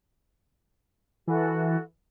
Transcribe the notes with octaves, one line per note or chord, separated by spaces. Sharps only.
E3 F#4 A4